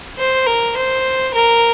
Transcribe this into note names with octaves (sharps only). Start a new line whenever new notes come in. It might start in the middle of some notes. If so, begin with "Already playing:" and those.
C5
A#4
C5
A#4